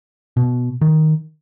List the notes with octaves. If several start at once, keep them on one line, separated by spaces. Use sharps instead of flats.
B2
D#3